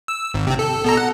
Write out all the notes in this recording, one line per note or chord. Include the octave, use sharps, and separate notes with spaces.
E6
G#1
C3 C4
A4
B2 A4 A#5
F#5